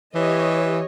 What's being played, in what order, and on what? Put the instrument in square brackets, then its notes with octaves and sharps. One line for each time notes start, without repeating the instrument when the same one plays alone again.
[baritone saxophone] E3 [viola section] G4 C#5 D#5